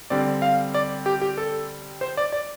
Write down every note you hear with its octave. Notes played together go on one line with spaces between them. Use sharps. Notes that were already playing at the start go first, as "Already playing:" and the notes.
D3 G3 C4 D5
F5
D5
G4
G4
A4
C5
D5
D5